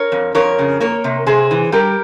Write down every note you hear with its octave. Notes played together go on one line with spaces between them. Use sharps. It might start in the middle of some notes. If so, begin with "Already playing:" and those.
Already playing: A#4 C#5
F2
F2 A#4 C#5
C#3
A#3 A#4 C#5
C3
C3 G#4 C5
E3
G3 G4 A#4